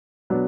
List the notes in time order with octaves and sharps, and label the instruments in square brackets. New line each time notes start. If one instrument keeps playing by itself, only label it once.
[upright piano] B2 F#3 B3 D4